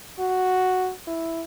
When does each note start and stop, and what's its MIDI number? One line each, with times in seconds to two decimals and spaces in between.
0.19 0.92 66
1.07 1.43 64